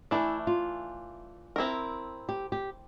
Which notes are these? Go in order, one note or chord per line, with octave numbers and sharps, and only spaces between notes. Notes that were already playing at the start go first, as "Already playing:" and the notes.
E3 A3 D4 E4
F4
C4 E4 A#4
G4
G4